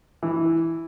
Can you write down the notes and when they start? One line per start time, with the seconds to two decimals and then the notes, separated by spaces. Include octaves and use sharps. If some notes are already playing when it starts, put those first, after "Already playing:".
0.22 E3